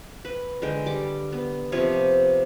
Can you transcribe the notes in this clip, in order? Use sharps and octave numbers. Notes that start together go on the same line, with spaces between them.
B4
D3 G#3 G5
G3 D6
B3
C3 F3 B3 C#5